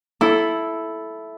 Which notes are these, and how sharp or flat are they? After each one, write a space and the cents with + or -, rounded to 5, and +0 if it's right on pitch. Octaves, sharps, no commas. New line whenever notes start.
E4 +0 A4 -10